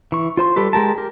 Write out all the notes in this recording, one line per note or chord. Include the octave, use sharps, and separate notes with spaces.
E3 C#6
F4 C5 C6
G3 G4 A4 B4
G#3 G4 A#4 A5
G4 A#4